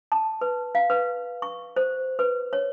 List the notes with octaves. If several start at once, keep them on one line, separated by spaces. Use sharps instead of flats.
A5
B4
F5
B4
C#6
C5
B4
C#5